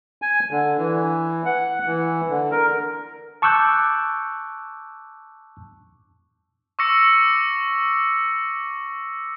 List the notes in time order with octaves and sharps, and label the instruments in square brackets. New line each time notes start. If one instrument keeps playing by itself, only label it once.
[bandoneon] G#5
D3
E3
F#5
E3
D3
A#4
[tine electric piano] A5 C#6 D6 E6 F#6 G6
[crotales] C#6 D6 E6 A#6 C#7